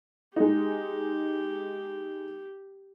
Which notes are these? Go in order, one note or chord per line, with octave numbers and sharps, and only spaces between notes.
G#3 D#4 G4